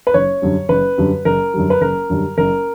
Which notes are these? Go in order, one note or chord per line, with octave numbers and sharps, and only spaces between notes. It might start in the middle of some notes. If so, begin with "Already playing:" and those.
B4
F#1 C#5
F#2 D3 G3
F#1 B4
F#2 D3 G3
F#1 A#4
F#2 D3 G3
B4
F#1 A#4
F#2 D3 G3
F#1 A#4